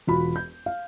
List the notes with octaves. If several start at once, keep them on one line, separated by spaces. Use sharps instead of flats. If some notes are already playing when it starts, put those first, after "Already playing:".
E1 F4 F#4 B5
G6
F5